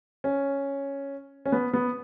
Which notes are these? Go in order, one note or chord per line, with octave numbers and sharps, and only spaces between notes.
C#4
C#4
B3
B3